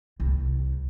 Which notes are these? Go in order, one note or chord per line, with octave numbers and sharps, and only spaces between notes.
C2